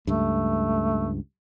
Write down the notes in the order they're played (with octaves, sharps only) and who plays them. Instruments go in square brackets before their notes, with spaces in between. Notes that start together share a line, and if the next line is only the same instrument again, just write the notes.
[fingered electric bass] C#2 G2 [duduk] A3